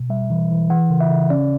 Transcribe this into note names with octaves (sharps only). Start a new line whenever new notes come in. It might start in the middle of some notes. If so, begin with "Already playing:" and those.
Already playing: B2
G3 E5
E3
E3
E3 F#5
C#3
E5
C#3
C#4 D5